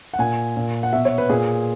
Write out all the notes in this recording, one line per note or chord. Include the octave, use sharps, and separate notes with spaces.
F#5
A#2 G#5
A#2
F#5
B2 E5
C#5
B4
A#2 G#4